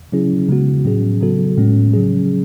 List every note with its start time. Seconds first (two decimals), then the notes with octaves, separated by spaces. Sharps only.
0.12 C#3 F#3 C#4 E4 G#4
0.49 C#3 G#3 B3 F#4
0.85 A2 F#3 C#4 G#4
1.21 C#3 F#3 B3 F#4 A4
1.58 A2 G#3 C#4
1.93 C#3 F#3 C#4 G#4